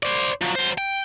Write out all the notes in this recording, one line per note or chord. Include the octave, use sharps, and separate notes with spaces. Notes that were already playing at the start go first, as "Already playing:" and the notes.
C5 D5
F3 F#3
F#3 C5
G5